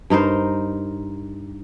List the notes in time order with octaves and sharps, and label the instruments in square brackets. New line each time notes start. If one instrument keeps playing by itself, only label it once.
[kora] G2 D#4 A#4 C5